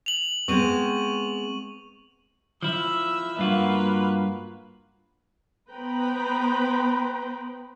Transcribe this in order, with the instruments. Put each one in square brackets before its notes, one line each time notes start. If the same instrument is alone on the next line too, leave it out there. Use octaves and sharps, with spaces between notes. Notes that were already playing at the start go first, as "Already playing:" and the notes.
[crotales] F7 F#7
[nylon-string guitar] G#3 B3 C4 [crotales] C#6 D#7
[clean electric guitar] F3 E4 [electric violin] E5 E6
[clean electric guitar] G2 F4 F#4 [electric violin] A#3 B4
[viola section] B3 B4 C5 G5 A#5 B5